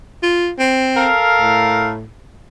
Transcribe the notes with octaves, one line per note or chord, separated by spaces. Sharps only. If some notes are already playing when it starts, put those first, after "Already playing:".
F4
C4
A4 A#4 F5
A2